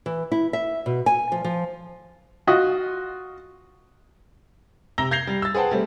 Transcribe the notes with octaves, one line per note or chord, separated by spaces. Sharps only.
E3
E4
E5
B2
G#5
F3
F3
F4 F#4 D#5
C3 A#5 E6 A#6 G7
G6 G#6 A#6 C7 F7 G7
G3
E6 A6
G#4 B4 C5 F#5 G5 A5
G3 A3 C4